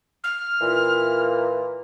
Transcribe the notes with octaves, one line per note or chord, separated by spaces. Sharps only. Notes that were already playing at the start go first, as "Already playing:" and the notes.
F6
A#2 E3